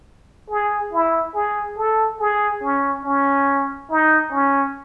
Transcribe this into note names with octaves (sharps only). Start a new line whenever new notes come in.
G#4
E4
G#4
A4
G#4
C#4
C#4
D#4
C#4